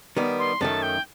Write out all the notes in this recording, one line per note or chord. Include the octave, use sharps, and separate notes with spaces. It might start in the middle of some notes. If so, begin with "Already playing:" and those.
D#3 G3 B3
C6
F#2 D#3 A3 A5
G5